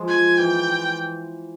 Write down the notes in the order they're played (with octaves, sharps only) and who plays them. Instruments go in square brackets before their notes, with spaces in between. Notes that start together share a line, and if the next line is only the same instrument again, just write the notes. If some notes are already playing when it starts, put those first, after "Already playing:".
Already playing: [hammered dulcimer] F3 G#3
[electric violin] G#5
[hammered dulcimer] E3 [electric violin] G5